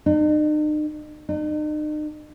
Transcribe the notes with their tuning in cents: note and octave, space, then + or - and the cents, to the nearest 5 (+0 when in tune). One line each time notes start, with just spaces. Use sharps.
D#4 -45
D#4 -40